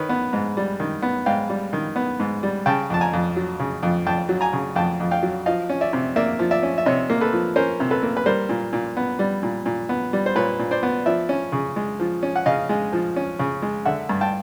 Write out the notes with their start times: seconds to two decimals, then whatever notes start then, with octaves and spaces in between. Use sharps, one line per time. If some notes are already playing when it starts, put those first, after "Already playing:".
Already playing: D#3 B4 C#5
0.09 B3
0.33 G#2
0.57 G3
0.80 D#3
1.02 B3
1.26 G#2 F5 G5
1.49 G3
1.73 D#3
1.96 B3
2.20 G#2
2.43 G3
2.66 C#3 G5 A5
2.90 F2 A5
3.01 G#5 A#5
3.13 F2
3.36 F#3
3.60 C#3
3.83 F2
4.06 F2 G5 A5
4.29 F#3
4.41 G#5 A#5
4.53 C#3
4.76 F2 G5 A5
5.00 F2
5.11 F5 G5
5.23 F#3
5.46 F3 D#5 F5
5.70 C#4
5.81 D5 E5
5.93 C3
6.16 A#3 D5 E5
6.39 F3
6.51 D5 E5
6.63 C#4
6.78 E5
6.86 C3 C#5 D#5
7.10 A#3
7.21 A4 B4
7.33 F3
7.56 C#4 A#4 C5
7.80 C3
7.91 A4 B4
8.03 A#3
8.17 B4
8.26 G3 A#4 C5
8.49 A#2
8.73 A#2
8.97 B3
9.19 G3
9.43 A#2
9.66 A#2
9.89 B3
10.13 G3
10.26 C5
10.36 A#2 B4 C#5
10.59 A#2
10.71 C5 D5
10.83 B3
11.06 F3 D5 E5
11.29 C#4
11.52 C#3
11.76 G#3
12.00 F3
12.23 C#4
12.36 F#5
12.46 C#3 D#5 F5
12.69 G#3
12.93 F3
13.16 C#4
13.39 C#3
13.62 G#3
13.85 D3 E5 F#5
14.09 G2
14.21 G5 A5